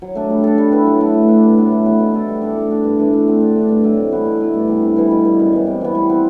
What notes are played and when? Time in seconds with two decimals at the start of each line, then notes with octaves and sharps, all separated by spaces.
0.02 F#3
0.15 A3 D4
0.30 G3
0.44 D4 A4
0.58 G3
0.72 B3 E4 B4
0.86 F#3
1.01 A3 E4
1.14 A3
1.28 D4 F#4 B4
1.43 G2
1.57 F#3 B3 D4
1.72 A2
1.85 E3 B3 F#4
2.00 B2
2.14 A3 E4 A4
2.28 G3
2.41 D4 A4 D5
2.57 A3
2.70 D4 F#4
2.84 G2
2.99 E3 A3 D4
3.13 A3
3.28 C4 F#4 C5
3.40 D3
3.56 A3 D4
3.69 G2
3.84 F#3 A3 E4
3.97 C3
4.12 E3 B3 F#4
4.25 B2
4.41 A3 E4
4.54 G2
4.68 E3 G3 B3
4.82 C3
4.96 E3 G3 B3
5.11 B2
5.25 G3 B3
5.39 F#2
5.53 E3 G3
5.67 C3
5.81 E3 B3
5.95 G3
6.09 C4 F#4